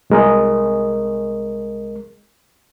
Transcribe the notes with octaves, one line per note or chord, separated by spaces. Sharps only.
C2 G#3 A#4 D#5